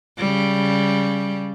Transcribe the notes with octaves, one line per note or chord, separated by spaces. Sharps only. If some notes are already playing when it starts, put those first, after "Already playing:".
C#3 G3